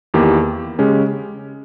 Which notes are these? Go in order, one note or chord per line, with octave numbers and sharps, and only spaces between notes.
E2 D#3 A#3 E4 G4
C#3 G#3 C#4 G4